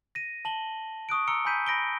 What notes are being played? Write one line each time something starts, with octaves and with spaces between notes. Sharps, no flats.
A#6 D#7
A5 F#7 G7
C#6 D#6 F#6 D7
A#5 E6 C#7 G7
G#5 A#5 B5 G6 B6 D#7
B5 A#6 D7 G7